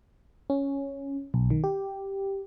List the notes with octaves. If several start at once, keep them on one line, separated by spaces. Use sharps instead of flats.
C#4
B1
D#3
G4